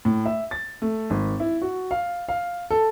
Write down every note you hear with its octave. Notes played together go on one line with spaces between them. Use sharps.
A2
E5
A6
A3
G#1
E4
F#4
F5
F5
A4